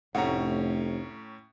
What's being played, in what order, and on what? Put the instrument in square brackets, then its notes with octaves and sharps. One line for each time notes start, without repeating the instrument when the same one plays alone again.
[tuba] F1 [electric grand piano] A2 C#4 A#5 [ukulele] F#5